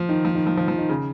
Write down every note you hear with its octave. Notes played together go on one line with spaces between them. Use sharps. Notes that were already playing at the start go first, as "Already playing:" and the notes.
Already playing: F3
D#3
F3
D#3
F3
F3
F3
D#3
C#3